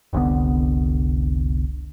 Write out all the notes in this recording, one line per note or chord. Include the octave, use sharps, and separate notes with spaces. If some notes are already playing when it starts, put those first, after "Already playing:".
F1 C2 D3 B3